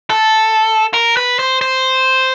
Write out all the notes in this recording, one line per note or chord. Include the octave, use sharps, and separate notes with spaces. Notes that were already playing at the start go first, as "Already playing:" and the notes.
A4
A#4
B4
C5
C5